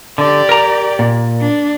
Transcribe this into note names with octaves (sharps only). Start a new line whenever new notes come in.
D3 G4 D5
A#4 A#5
A#2
D4